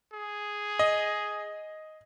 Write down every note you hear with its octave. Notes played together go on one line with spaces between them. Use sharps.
G#4
D#5